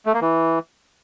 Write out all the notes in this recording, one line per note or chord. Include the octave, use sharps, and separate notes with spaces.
A3
A#3
E3